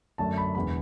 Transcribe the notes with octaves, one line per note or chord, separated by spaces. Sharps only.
F#2 D3 F#3 A3 D4 A5
B5
E1 E2 D3 B5